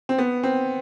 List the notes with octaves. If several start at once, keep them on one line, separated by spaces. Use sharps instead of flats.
C4
B3
C4